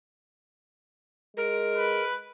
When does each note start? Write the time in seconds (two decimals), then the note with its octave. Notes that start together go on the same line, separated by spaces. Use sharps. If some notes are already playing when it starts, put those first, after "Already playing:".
1.37 G#3 A#4
1.77 B4